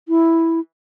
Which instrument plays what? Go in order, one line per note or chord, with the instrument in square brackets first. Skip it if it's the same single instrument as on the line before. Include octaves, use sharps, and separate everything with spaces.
[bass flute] E4